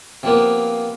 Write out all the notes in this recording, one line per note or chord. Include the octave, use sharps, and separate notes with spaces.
C3 F3 A#3 B3